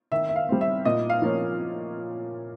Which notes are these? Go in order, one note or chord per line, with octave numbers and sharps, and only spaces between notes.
D#3 E5
E5
F5
G3 C4
E5
A#2 D#5
F5
F3 A#3 C#4